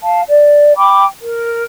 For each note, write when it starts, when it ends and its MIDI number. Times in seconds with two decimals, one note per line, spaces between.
0.01 0.20 77
0.01 0.20 81
0.27 0.75 74
0.76 1.03 79
0.76 1.03 83
0.76 1.03 86
1.19 1.61 70